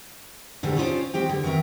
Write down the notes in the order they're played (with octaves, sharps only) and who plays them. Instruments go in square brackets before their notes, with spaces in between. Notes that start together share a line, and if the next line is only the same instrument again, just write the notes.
[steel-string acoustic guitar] A#2 D3 F3 G#3 G4
C#4 D#4 F4 G#4 C5 D5
G#3 C4 G4 G5
D3
D#3 F#3 C4 A#4 E5